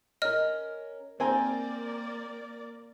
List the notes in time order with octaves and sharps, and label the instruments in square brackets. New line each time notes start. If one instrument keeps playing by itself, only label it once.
[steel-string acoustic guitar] C#4 A#4 [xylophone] D#5 F6
[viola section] A#3 A#4 D5 [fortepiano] C4 G#5 A#5 [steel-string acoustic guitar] G5